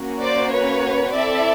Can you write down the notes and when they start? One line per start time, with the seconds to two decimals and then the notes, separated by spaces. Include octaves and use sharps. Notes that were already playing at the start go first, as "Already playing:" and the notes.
Already playing: A#3 C#4 F#4
0.21 C5 D5
0.52 B4 C#5
1.13 C4 E4 A4 D5 E5